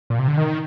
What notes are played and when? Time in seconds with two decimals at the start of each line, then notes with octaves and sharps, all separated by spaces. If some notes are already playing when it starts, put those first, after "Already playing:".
0.10 A#2
0.19 C3
0.28 D3
0.37 D#3